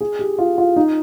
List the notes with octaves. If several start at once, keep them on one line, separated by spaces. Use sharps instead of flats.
G#4
G4
F4
F4
D#4